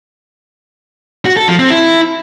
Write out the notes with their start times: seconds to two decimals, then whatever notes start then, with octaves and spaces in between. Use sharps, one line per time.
1.25 F#4
1.37 A4
1.48 F3
1.59 C4
1.70 E4